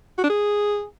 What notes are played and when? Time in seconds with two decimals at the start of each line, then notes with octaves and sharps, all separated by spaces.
0.18 F#4
0.24 D4
0.30 G#4